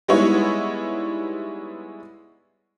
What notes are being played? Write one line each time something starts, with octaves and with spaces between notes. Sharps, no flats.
G3 G#3 B3 D#4 E4 C#5